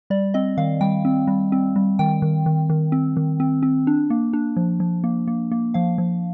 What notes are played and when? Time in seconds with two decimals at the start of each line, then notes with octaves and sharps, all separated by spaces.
0.10 G3 D5
0.34 C4 D#5
0.57 D#3 F5
0.81 G3 G5
1.05 C4
1.28 G3
1.52 C4
1.76 G3
1.99 D#3 G5
2.22 D#3
2.46 D#3
2.70 D#3
2.92 C4
3.17 D#3
3.40 C4
3.63 C4
3.87 D4
4.10 A#3
4.33 D4
4.56 F3
4.80 F3
5.04 A#3
5.28 A#3
5.52 A#3
5.74 F3 F5
5.98 F3